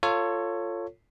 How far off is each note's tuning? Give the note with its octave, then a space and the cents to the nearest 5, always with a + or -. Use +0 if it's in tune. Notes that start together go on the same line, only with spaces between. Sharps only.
F4 +0 A4 +25 C#5 +0